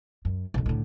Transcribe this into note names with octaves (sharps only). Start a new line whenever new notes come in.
F#2
B1 F#2
A2 D3